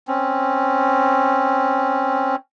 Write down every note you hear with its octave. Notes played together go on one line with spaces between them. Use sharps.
C4 C#4